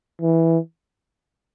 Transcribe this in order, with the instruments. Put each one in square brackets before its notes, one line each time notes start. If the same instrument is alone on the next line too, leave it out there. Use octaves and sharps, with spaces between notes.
[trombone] E3